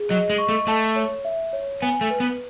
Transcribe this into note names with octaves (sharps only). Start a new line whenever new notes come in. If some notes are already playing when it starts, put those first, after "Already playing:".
Already playing: G#4
F#3 D#5
G#3
C#6
A3
A3 A5
C#5
E5
C#5
B3 G#5
A3
B4
B3